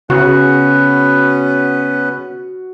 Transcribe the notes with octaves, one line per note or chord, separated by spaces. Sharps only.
C#3 B3 C#4 F#4 B4